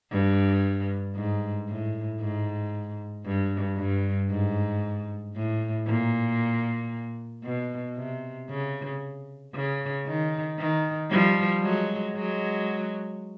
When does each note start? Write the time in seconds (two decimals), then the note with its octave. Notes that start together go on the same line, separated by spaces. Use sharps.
0.11 G2
1.15 G#2
1.68 A2
2.20 G#2
3.25 G2
3.77 G2
4.30 G#2
5.35 A2
5.87 A#2
7.44 B2
7.97 C3
8.49 C#3
9.54 C#3
10.06 D#3
10.58 D#3
11.11 F3 G3
11.63 F#3 G#3
12.15 F#3 G#3